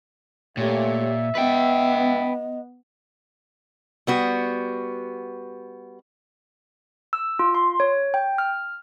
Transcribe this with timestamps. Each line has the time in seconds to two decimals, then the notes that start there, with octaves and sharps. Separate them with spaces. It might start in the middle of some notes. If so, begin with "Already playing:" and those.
0.57 A#2 A3 G4 C#5 E5
1.35 B3 B4 D#5 G5
4.07 G3 B3 F#4
7.13 E6
7.39 F4
7.55 C6
7.80 C#5
8.14 G5
8.38 F6